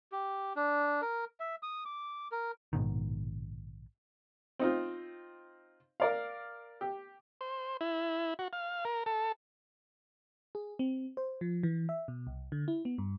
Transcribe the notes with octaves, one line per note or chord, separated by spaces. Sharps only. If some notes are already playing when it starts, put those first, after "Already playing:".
G4
D4
A#4
E5
D#6
D6
A#4
A#1 G#2 B2 D#3
C4 D#4 F4
A#4 D5 F5
G4
C5
E4
F#4
F5
A#4
A4
G#4
C4
C5
F3
E3
E5
B2
C2
D3
E4
B3
G2